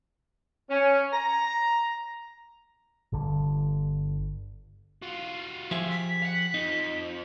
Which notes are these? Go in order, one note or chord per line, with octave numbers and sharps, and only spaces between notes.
C#4
A#5
G1 D3
F4 F#4
F3 G4 G#4 E5
B6
F5 F#5
F2 D#4